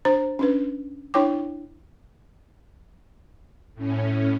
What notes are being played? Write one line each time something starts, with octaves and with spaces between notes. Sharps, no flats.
D4 C5 A#5
C#4 D4 B4
D4 E4 C#5 G5 D6
A2 C#4